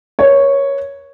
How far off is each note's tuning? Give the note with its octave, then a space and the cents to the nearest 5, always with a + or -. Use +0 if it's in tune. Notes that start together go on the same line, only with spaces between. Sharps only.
A#4 +40 C#5 +0